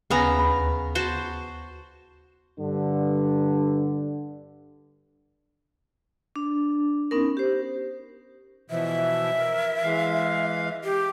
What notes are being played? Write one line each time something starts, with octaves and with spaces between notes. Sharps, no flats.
D#2 C#3 B3 G#5 A#5 A#6
D2 B5
F#4 C5 A5
G2 D3
D4
B3 C#4 D#4 A#4
G4 C5
B2 E3 F3 E5
A#4
E3 G#3 F5
G4